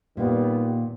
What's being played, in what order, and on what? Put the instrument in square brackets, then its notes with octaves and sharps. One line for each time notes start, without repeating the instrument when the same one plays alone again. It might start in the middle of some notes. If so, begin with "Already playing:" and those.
[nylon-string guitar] A#2 [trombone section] D#3 G3 B3 G4